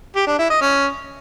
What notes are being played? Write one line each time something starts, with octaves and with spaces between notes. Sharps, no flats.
G4
D4
E4
D#5
C#4